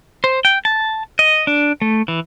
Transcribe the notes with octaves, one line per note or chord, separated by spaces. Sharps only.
C5
G5
A5
D#5
D4
A3
E3